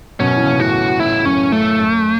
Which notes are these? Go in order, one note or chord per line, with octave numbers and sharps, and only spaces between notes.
F#2 B2 C#4
E3
C#3
B2
A2 F#4
A2 E4
F#2 C#4
A2 A3
F#2